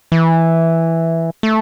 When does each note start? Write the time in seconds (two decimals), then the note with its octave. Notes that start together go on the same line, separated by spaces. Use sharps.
0.12 E3
1.43 A3